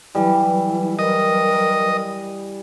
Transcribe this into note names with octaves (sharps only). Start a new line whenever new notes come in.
E3 F#3 G3 E4 B4
A#4 D#5